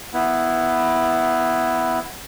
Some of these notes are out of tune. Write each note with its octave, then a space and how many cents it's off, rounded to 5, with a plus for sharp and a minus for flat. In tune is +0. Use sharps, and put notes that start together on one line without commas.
B3 +0 E4 +0